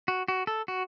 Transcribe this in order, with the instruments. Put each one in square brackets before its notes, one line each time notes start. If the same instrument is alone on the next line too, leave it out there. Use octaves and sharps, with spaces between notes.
[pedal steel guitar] F#4
F#4
A4
F#4